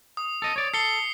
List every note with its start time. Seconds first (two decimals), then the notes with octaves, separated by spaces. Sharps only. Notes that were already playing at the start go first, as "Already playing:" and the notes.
0.17 D#6
0.42 A4 D#5
0.56 C#5 D5
0.74 A4 C7 C#7 G7